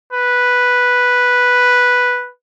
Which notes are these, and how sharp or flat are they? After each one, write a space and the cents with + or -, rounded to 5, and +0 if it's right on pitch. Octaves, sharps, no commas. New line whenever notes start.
B4 -5